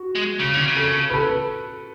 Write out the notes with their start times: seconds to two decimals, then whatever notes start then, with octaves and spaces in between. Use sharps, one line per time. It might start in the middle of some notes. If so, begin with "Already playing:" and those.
Already playing: F#4
0.15 G#3
0.39 C#3
0.54 D3
0.67 C#3
0.76 A4
1.10 B4
1.14 A4